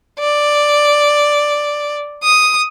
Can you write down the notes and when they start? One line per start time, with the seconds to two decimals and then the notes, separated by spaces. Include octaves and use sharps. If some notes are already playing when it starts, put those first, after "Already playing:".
0.19 D5
2.24 D#6